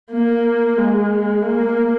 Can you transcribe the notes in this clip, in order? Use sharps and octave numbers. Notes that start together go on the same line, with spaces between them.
A#3
G#3
A#3